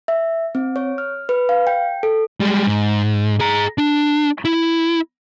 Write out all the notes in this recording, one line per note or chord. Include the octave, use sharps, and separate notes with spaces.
E5
C4
C#5
F6
B4
F5
G5
A4
G3 G#3
G#2
G#4 A#5
D4
E4